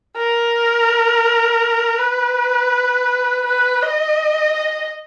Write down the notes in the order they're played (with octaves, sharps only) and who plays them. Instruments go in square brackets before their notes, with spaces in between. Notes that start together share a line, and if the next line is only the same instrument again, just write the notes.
[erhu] A#4
B4
B4
D#5